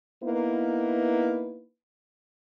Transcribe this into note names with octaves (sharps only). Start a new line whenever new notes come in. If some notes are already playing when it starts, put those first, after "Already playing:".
A#3 B3 D#4 E4 B4